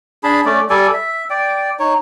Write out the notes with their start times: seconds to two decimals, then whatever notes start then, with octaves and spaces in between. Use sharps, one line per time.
0.23 D4 G#4 A5 B5
0.46 A3 C#4 D5
0.70 G3 A4 D5 G#5
0.93 E5
1.30 D5 G5
1.80 D#4 C#5